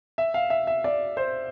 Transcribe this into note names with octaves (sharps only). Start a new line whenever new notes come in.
E5
F5
E5
E5
D5
C5